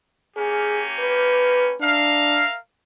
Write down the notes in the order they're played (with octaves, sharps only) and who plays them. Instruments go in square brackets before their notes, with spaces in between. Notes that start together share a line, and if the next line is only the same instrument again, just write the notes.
[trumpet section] A#3 C#4 G4 [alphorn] G#4
[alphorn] B4
[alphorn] D4 [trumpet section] A#4 E5 F5